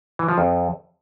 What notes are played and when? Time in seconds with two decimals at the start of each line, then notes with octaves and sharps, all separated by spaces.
0.19 E3
0.29 F3
0.38 F2